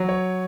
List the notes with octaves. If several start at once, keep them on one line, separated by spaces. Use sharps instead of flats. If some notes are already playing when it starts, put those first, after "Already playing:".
Already playing: F#3
C#5